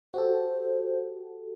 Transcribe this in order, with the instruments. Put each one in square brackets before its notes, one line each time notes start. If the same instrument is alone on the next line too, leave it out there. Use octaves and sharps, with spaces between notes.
[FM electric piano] F#4 G4 A4 [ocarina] C5